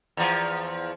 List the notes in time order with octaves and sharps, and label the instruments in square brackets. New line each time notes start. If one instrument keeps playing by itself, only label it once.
[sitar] E2 F3